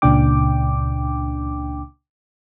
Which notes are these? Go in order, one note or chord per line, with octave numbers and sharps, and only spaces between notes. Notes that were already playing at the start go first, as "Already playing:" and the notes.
C#2 A#2 C#3 D4 G5 D6